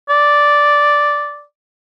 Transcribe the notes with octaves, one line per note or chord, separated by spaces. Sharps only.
D5